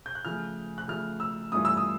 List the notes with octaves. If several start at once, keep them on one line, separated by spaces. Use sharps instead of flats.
G6
F#6
C#3 F3 A3 F6
F#6
C#3 F3 A3 F6
E6
G2 E3 A3 C#4 F4 D#6
E6
D#6